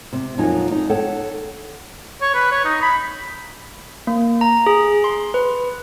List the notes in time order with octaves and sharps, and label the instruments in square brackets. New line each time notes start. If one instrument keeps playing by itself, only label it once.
[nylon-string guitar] C3
F2 A#2 F#3 D#4 G#5
D#4
A4 C#5 F#5 G5
[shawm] C#5
B4
C#5
D#4
B5
[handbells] A#3
A#5
G#4
C6
B4